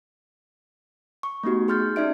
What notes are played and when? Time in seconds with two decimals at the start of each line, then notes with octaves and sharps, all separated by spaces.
1.23 C#6
1.43 A3 B3 D#4 F#4 G4
1.68 D#4 G#4 C6 F6 G6 A6
1.96 C#4 D#4 D5 E5 D7